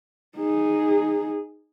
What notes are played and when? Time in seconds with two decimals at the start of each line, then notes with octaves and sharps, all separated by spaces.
0.37 D#4 G#4